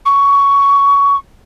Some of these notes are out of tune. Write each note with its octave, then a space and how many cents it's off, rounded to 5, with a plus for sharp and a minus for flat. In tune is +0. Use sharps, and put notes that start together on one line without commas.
C#6 +15